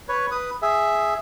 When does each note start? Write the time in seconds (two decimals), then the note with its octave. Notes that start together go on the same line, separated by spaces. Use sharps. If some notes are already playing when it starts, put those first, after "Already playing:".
0.09 B4 C#5
0.31 B4 D#6
0.62 G#4 E5